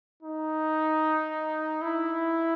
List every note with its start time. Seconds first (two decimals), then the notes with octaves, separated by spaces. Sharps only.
0.23 D#4
1.82 E4